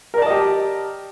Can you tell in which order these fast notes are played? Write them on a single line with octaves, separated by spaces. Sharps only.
A#4 D5 A5 D#5 G4